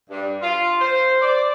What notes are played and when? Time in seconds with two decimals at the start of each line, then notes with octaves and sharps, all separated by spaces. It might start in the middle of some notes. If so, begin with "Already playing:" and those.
0.10 G2
0.42 F4
0.81 C5
1.21 D5